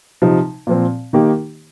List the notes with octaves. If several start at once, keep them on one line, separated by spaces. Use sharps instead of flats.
C3 F3 D#4
A#2 F3 C4
D#3 A#3 D#4 G4